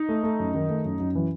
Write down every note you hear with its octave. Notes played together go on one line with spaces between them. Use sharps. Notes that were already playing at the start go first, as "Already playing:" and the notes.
Already playing: D#4
A3
A3
F#2
D#3
A3
F#2
F#2
E3